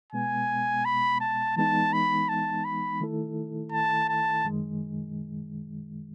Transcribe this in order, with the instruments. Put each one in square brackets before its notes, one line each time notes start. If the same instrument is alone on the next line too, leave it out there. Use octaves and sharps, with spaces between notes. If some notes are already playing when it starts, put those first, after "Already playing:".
[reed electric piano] B2 G#3 B3 [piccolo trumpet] G#5
[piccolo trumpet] B5
A5
[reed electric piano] E3 G#3 B3 D#4 [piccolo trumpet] A5
[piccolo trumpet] B5
A5
B5
[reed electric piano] D#3 A3 E4 A4
[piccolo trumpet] A5
A5
[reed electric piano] F#2 D#3 G#3